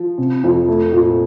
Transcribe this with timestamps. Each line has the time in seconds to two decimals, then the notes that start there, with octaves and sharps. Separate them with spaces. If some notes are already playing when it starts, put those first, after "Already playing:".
Already playing: F3
0.18 C3
0.44 F2
0.68 A3
0.92 A#2